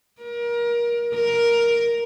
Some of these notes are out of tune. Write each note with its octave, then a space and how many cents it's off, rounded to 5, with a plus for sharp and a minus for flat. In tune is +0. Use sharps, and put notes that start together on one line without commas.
A#4 +25
A#4 +5